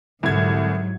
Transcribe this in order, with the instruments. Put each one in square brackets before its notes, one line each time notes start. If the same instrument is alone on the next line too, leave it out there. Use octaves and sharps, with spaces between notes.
[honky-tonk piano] C2 G#6 [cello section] G#2 F#3 [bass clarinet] D3